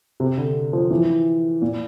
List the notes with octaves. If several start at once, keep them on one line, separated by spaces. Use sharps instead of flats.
C3
D3
F3
E3
A#2